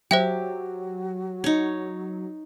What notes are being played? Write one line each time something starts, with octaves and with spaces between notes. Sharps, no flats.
F#3 F#4 G4 C5 E5 G5
D#4 C#5